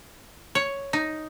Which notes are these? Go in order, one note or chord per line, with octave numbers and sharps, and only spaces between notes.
C#5
D#4